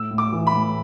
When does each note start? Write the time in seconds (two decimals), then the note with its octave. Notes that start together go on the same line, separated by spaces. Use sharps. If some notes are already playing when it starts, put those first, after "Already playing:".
Already playing: A2 E6
0.11 A2
0.18 D6
0.33 E3
0.47 B5
0.54 A2